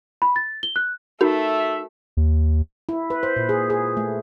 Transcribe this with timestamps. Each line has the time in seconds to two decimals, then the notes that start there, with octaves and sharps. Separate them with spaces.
0.22 B5
0.36 A6
0.63 G7
0.76 F#6
1.21 A3 D#4 F#4 A#4 E5
2.17 D#2
2.89 E4
3.10 B4
3.23 C5
3.36 A#2
3.49 G#4
3.70 G#4
3.97 A3